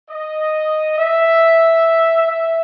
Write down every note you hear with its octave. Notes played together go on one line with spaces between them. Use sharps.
D#5
E5
E5